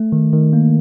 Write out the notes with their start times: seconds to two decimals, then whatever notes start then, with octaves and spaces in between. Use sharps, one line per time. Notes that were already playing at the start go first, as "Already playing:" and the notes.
Already playing: A3
0.12 D#3
0.33 D#3
0.53 A#3